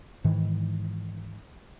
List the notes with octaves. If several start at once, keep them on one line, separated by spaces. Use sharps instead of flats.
G#2 D#3 E3